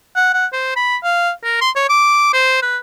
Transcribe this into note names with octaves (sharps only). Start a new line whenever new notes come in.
F#5
F#5
C5
B5
F5
A#4
C6
C#5
D6
C5
B4